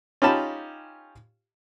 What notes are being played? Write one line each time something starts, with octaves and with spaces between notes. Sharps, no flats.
C#4 D#4 F4 G4 A5 B5